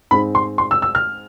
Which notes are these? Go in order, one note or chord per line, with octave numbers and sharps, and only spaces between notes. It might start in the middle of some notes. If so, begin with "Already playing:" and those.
G#2 G#3 C4 B5
C6
C6
E6
E6
F6